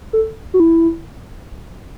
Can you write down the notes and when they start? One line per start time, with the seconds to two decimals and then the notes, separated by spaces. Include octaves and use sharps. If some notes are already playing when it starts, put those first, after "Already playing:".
0.13 A4
0.54 F#4
0.60 E4